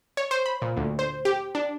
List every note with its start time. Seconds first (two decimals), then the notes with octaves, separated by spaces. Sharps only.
0.17 C#5
0.31 C5
0.46 B5
0.62 A#2
0.77 D2
0.99 C5
1.25 G4
1.55 D4